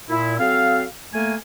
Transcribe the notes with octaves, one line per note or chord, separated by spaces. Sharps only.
A#2 E4
F#3 C4 A4 F5
A3 A#3 G#5